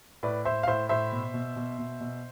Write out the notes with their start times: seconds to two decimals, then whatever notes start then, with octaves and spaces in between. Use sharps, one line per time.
0.23 A2 B4 D5
0.45 A2 C5 E5
0.63 F5
0.67 A2 C5 E5
0.89 A2 C5 E5
1.12 B2
1.34 B2
1.56 B2
1.79 B2
2.00 B2